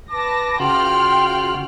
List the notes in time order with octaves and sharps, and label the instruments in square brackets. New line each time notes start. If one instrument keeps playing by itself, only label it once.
[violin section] B4 A5 A#6 [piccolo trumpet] D6
[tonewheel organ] C#3 F#4 F#6 [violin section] F4 G5 F6 [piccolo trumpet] C6